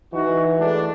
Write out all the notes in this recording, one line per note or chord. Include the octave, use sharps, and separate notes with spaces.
E3 D#4 F#4
G#3 A3 D4